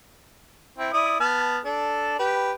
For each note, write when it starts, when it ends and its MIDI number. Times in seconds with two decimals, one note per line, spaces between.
0.78 0.92 60
0.78 0.92 64
0.93 1.19 64
0.93 1.19 74
0.93 1.19 87
1.20 1.59 59
1.20 1.59 81
1.20 1.59 89
1.65 2.15 62
1.65 2.15 69
2.19 2.52 67
2.19 2.52 71